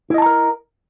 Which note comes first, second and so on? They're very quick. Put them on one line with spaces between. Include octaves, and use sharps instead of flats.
E4 D#5 A5 A#5 A#4